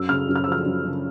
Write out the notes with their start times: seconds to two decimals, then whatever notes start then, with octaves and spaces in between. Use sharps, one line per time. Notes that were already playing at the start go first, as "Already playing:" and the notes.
Already playing: F#2 E6
0.09 C#3 F6
0.29 F#2
0.36 F6
0.44 E6
0.48 F3 F6
0.66 F#2
0.85 C#3